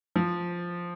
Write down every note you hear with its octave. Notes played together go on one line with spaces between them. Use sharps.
F3